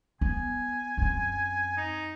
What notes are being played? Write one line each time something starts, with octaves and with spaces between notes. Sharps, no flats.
B3 G#5
F#2 C4
D#4